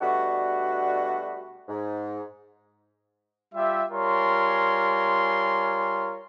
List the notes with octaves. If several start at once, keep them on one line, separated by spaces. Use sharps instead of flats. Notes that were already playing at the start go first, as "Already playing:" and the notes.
B2 G3 A3 D4 F#4
G#2
G3 F4 G4 E5
G3 F4 A#4 C#5 G#5 C6